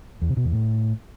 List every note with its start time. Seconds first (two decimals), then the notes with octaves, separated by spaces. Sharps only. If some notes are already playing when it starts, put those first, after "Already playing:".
0.22 E2
0.29 C3
0.37 B2
0.45 E2
0.52 A2